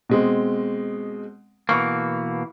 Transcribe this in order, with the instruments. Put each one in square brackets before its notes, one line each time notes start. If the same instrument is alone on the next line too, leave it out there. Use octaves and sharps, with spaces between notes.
[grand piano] B2 G#3 C4
[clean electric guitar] B2 E3 A#3 [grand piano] C#6